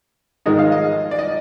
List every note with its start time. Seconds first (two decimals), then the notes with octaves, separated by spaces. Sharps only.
0.46 G#2 D#3 G#3 D#4 D#5
0.59 F5
0.72 D#5
1.11 D5
1.19 D#5